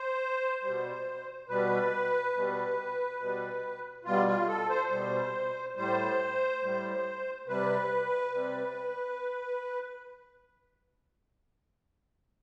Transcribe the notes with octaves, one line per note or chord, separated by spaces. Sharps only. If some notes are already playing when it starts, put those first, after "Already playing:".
Already playing: C5
B2 G3
B2 G3 B4
B2 G3
B2 G3
B2 G3 F4
F4
A4
C5
B2 G3
A2 G3 C5
A2 G3
C3 G3 B4
C3 G3